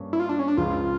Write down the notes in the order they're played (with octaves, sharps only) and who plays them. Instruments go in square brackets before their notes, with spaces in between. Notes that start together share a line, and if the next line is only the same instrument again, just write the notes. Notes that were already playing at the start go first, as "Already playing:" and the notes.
Already playing: [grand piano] G2 A#3 C#4
[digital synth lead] E4
F4
D4
C#4
D4
[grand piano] C#2 C#3 F3 [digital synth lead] F4